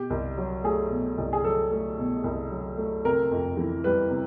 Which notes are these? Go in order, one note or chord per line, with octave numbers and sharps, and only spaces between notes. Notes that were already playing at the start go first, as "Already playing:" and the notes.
Already playing: B2 G4
C2
F#3
A3 G#4
B2
C2
G#4
F#3 A4
A3
B2
C2
F#3
A3
C3 A#4
F2
E3
G3 B4
C3